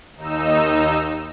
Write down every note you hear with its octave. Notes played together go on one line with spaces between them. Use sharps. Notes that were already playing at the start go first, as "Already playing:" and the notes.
D#2 D#4 E6